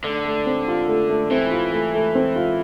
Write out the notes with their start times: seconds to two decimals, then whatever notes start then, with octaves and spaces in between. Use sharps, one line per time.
0.04 D3 A3
0.25 A3
0.46 C4
0.68 F4
0.88 A3
1.09 A3
1.31 E3 C4
1.51 F4
1.72 A3
1.94 A3
2.15 C4
2.36 F4